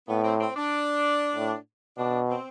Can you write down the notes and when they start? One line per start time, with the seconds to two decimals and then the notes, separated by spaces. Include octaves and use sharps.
0.08 A2 B3
0.24 C4
0.40 C4
0.56 D4
1.35 A2
1.97 B2 D4
2.29 C4